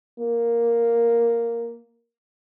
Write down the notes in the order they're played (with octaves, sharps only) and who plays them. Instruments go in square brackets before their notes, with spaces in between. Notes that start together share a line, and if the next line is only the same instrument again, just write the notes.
[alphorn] A#3